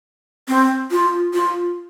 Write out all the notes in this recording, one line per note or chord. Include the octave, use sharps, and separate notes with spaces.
C4
F4
F4